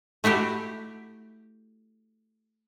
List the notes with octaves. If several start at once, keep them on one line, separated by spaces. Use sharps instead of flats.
A3 E4 F#4 G4